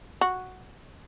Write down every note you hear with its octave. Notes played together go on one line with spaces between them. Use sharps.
F#4